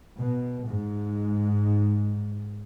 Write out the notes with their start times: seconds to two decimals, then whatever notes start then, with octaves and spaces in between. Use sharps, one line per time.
0.19 B2
0.67 G#2